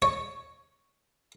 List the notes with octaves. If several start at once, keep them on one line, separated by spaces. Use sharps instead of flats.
C#5